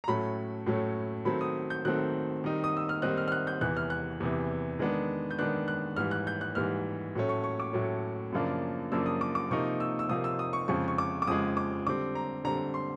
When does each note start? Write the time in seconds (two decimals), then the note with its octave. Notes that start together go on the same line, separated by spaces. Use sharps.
0.04 A#5
0.08 A2 F#3 A3 C#4 B5
0.66 A2 F#3 A3 C#4
1.25 D#3 F#3 A3 C4 B5
1.41 D#6
1.70 G6
1.85 D#3 F#3 A3 C4 F#6
2.44 D#3 G3 C4 D#4
2.64 D#6
2.77 E6
2.89 F6
3.02 D#3 G3 C4 D#4 F#6
3.17 F6
3.28 F6
3.32 F#6
3.47 G6
3.61 E2 C3 E3 F#6
3.77 F6
3.90 F#6
4.20 E2 C3 E3
4.79 D#3 G#3 B3 D4
5.31 G6
5.39 D#3 G#3 B3 D4 F#6
5.68 F#6
5.96 G#2 E3 G3 F6
6.11 F#6
6.27 G6
6.41 F#6
6.55 G#2 E3 G3 F6
7.15 A2 F#3 A3 C#4
7.29 C#6
7.44 C#6
7.60 D6
7.73 A2 F#3 A3 C#4
8.32 F#2 C#3 F3 A#3 D4
8.92 F#2 C#3 F3 A#3 D4 E6
9.06 D#6
9.21 D6
9.35 D6
9.51 C3 F3 A#3 D#4 C#6
9.80 E6
9.99 E6
10.09 C3 F3 A#3 D#4 D#6
10.24 E6
10.39 D#6
10.53 C#6
10.68 F2 C#3 F3 G#3 C#6
10.88 C#6
10.98 D6
11.22 D6
11.27 F2 C#3 F3 G#3 D#6
11.57 D6
11.87 D3 G3 C4 D6
12.15 A#5
12.44 D3 G3 C4 A#5
12.74 C6